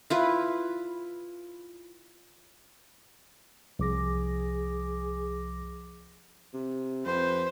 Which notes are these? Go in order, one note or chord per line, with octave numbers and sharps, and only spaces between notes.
E4 F4 B4
C2 F3 G#4 D6 A#6
C3
F2 B4 C5